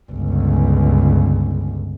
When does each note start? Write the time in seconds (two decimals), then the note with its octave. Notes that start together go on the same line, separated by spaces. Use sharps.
0.11 G1 C#2